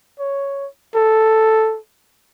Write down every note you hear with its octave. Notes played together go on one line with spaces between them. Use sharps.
C#5
A4